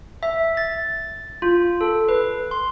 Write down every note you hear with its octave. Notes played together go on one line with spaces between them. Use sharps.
E5
A6
F4
A4
B4
C6